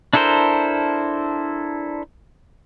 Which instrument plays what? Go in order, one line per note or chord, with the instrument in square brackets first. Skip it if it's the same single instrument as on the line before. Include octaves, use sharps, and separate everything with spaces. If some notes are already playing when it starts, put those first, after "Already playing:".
[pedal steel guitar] D4 E4 A4 A#4 C5